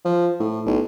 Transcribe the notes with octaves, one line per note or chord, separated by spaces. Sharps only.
F3
A2
B1